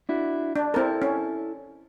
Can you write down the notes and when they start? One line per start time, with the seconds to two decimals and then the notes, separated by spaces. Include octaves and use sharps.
0.09 D4 E4 F#4
0.56 D4
0.74 C4 E4 A4 A#4
1.02 C#4